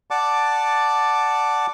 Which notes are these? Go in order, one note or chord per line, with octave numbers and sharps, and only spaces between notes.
D5 F#5 A5 D6